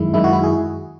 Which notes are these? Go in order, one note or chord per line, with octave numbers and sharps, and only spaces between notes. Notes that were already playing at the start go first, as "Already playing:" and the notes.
Already playing: F#2 D#3 G#3 E4
F#2 D#3 G#3 E4
F#4
E4
G#4